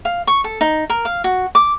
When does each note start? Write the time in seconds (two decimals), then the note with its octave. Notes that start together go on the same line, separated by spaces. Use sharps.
0.05 F5
0.27 C#6
0.44 A4
0.61 D#4
0.90 A#4
1.05 F5
1.24 F#4
1.55 D6